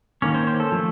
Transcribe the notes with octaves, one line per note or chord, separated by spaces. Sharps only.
D#3 A#3 C#4 C#5
C5
C5
A4
F3 A3